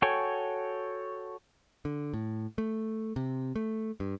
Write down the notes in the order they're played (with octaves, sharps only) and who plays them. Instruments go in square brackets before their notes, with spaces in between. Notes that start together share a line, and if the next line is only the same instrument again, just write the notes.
[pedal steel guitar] F#4 A4 C#5 G5 G#5
[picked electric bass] D3
A2
A3
C3
A3
G2